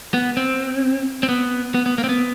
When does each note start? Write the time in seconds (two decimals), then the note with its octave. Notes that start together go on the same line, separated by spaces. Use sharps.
0.14 B3
0.37 C4
1.23 C4
1.29 B3
1.75 B3
1.86 B3
1.98 A#3
2.04 C4
2.09 B3